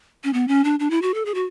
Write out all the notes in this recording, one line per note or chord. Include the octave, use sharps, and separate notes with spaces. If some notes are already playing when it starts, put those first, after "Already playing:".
C#4
B3
C#4
D4
D4
E4
F#4
A4
G#4
F#4